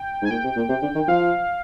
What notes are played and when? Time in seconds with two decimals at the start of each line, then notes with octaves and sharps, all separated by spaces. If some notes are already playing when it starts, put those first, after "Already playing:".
Already playing: G5
0.22 G#2 G#5
0.30 A#2 G5
0.44 C3
0.56 A#2
0.69 C3
0.82 D3
0.95 D#3
1.08 F3 F5